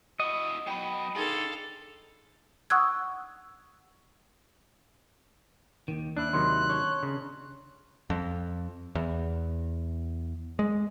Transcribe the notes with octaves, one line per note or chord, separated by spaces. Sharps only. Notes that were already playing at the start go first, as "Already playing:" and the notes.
E4 F#4 D#5
F#3 B3 G5 B5
D4 D#4 G#4 A4 F5 C6
F#5 C#6 D#6 E6 F#6 G#6
D#2 D#3
D#2 D4 E4 F#6
C3 D#3 F#3 C6
C#4 D4 C#5
C#3
F2
E2
G#3